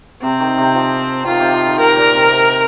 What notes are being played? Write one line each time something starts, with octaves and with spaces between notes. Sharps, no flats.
C3 C4
D#3
C3
F3
D#3 F4
C3
F3
D#3
C3 A#4
A#2
C3
C3